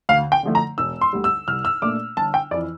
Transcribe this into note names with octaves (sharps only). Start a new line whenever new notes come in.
D2 F5
G5
D3 F3 A3
A#5
E1 E6
C6
D2 D3 G3
E6
C2 F6
E6
A#2 A3 D4 D6
G1 A5
G5
F2 E3 D5